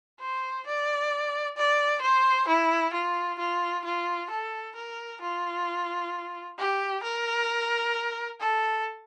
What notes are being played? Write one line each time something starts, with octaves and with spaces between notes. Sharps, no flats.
C5
D5
D5
C5
E4
F4
F4
F4
A4
A#4
F4
G4
A#4
A4